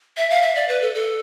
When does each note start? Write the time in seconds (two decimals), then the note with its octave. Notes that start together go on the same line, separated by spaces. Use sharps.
0.17 E5
0.30 F5
0.42 E5
0.55 D5
0.68 B4
0.82 A4
0.95 A4